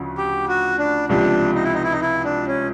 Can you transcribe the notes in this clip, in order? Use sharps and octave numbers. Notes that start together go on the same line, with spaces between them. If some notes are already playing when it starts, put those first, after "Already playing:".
Already playing: D2 C#3 F3
G4
F#4
D4
C#2 C3 F3 D4
D#4
E4
D#4
E4
D#4
E4
D4
C#4